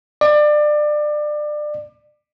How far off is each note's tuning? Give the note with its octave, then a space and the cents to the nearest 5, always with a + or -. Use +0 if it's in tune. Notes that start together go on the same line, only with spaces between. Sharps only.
D5 +25